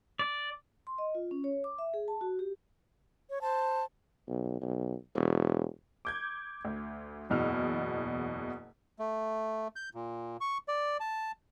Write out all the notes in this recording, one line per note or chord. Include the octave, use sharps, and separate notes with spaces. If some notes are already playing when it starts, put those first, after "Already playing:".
D5
C6
D#5
F4
C#4
C#5
D6
E5
G#4
A5
F#4
G4
C#5
C5 A5
B1
B1
E1
D6 G6 G#6
D2
F#1 E2 B2 E6 F6
A3
G6
A#2
C#6
D5
A5